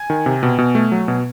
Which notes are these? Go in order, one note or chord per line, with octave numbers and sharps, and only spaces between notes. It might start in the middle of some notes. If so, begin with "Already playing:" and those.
Already playing: G#5
D#3
C3
B2
B2
A3
F#3
B2